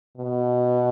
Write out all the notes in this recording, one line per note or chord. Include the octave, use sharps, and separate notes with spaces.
B2